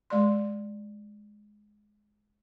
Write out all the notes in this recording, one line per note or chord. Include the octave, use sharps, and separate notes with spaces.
G#3 D5 C6